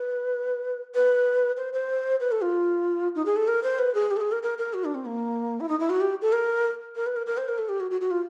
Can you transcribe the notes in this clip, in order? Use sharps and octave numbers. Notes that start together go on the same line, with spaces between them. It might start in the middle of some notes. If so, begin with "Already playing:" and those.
Already playing: B4
B4
C5
C5
B4
A4
F4
D#4
G#4
A4
A#4
C5
B4
G#4
G4
A4
G#4
A#4
A#4
A#4
F#4
D4
C4
A#3
E4
D#4
E4
F#4
G4
A4
A#4
A#4
B4
A#4
A#4
C5
A#4
A4
G4
F#4
F#4
F#4
F4